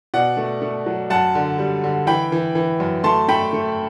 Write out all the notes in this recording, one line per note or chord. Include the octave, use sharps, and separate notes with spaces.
B2 D5 F#5
A3
A3
F#3
F#2 F#5 A5
D3
G3
D3
E3 G5 B5
E3
E3
F#2
A3 A5 C6
A3 G5 B5
A3